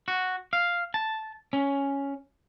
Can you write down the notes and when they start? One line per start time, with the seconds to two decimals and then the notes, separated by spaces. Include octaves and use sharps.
0.08 F#4
0.53 F5
0.94 A5
1.53 C#4